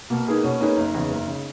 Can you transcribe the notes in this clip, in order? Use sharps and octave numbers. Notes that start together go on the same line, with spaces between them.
B2 A#3
A#3 B3 D#4 G#4 B4
B2 C#4
A#3 C#4 D#4 G#4 B4
F#1 D#4
E2 C#3
F#1
C#3